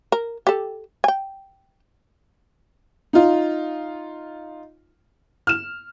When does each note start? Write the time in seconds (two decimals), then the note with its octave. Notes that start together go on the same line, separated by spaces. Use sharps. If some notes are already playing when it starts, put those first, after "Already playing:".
0.12 A#4
0.47 G4 A4
1.04 G5 G#5
3.13 D#4 F4
5.47 F6 E7